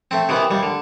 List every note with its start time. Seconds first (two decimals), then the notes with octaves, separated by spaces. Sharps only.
0.11 A3 C4
0.29 C3 D#3 E3 B3
0.51 D#2 G3
0.63 D3